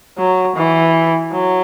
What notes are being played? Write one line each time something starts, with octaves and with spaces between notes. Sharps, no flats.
F#3
E3
F#3